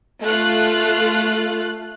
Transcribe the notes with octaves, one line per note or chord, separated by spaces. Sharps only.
A3 F4 F#6